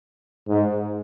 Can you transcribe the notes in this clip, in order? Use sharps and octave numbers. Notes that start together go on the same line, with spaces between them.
G#2